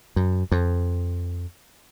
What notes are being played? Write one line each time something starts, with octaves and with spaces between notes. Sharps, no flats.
F#2
F2